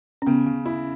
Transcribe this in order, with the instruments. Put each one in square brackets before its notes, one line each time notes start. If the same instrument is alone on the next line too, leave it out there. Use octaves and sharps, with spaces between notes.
[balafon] C#4
[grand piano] C#3 [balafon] B3
[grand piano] C#3
E4